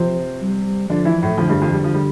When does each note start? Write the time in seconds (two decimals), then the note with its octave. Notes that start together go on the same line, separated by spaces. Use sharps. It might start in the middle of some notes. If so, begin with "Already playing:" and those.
Already playing: C3 F3 C4
0.42 G3
0.90 D3 F3 D4
1.05 E3 E4
1.22 A2 A3
1.38 F2 D3 F3
1.49 G2 G3
1.62 F2 F3
1.73 G3
1.84 F3
1.94 G3